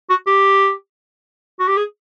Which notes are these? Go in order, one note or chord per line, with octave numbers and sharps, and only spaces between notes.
F#4
G4
F#4
G4
G#4